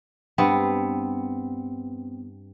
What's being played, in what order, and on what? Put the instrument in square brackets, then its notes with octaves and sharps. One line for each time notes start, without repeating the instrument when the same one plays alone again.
[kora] G2 B3 C4